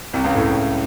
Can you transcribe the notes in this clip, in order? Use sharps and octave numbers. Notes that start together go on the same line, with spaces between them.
C2 C3
C#2 C#3
A2 A3